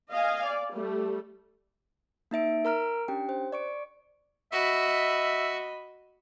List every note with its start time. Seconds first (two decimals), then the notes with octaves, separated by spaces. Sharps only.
0.10 D#5 F5 G#5
0.44 D5
0.74 G3 A3
2.31 A#3 D#4 E5 D7
2.65 A#4 A#5 F6 D7
3.08 C#4 D4 G4 G5
3.29 C5
3.52 D5 C#6 D7
4.52 F#4 D#5 E5 B5